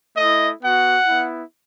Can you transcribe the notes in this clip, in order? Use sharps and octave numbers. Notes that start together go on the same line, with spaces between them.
A3 D#5
E4
B3 F#4 F#5
B3 E4